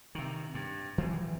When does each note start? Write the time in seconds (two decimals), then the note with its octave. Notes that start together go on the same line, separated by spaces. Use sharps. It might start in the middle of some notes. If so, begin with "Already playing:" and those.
0.15 C3 D#3
0.54 G2
0.98 E3 F#3 C4